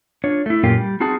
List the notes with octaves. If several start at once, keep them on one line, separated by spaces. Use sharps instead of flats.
D4 F4 C#5
A3 E4
F#2 A#2 A#3 C#4 F4 G4
G3
C4 D#4 F4 F#4 G#4 A5